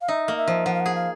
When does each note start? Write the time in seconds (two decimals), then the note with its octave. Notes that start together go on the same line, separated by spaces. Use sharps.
0.01 F5
0.08 D#4 E5
0.28 A#3
0.37 E5
0.47 F3
0.66 F3 F#5
0.74 F5
0.80 F#5
0.86 G#4
0.95 F5